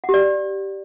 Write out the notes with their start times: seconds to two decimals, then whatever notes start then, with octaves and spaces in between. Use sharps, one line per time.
0.04 F#5
0.09 G4
0.14 D5